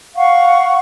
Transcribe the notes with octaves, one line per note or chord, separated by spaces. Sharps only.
F5 F#5 C#6